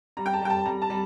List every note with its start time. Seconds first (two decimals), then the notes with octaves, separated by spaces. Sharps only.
0.17 G3 A#5
0.26 G5
0.33 A5
0.42 G3 G5
0.50 A5
0.65 G3 A#5
0.82 A5
0.90 G3